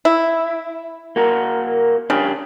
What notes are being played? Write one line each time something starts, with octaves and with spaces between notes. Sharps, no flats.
E4
A#3 F#4 A#4
C#3 D4 G4 G#4